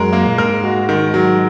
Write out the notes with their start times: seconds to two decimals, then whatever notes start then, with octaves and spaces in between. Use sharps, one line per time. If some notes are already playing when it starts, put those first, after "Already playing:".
Already playing: F#2 G#3 A#4
0.13 A#3
0.26 A#2
0.38 G#2 A#4
0.63 F#4
0.89 D#3
1.14 F#3